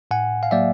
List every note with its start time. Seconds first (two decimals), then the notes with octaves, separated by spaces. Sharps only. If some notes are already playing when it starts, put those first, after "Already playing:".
0.11 A2 F#5 G#5
0.43 F5
0.51 F#3 A#3 D5 E5